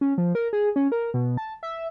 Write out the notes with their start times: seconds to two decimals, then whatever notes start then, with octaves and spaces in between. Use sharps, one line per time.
0.01 C#4
0.18 F3
0.35 A#4
0.53 G#4
0.76 C#4
0.92 A#4
1.14 B2
1.37 A5
1.63 E5